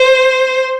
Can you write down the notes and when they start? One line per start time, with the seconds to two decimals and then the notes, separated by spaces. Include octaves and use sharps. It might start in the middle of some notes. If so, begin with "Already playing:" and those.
Already playing: C5